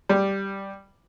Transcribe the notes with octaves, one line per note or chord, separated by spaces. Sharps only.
G3